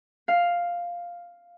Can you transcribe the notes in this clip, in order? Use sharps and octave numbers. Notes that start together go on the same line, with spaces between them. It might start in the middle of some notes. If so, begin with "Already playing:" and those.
F5